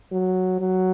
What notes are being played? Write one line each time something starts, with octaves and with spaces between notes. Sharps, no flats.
F#3
F#3